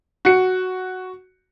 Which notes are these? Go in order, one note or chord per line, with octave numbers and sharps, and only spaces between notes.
F#4 C#7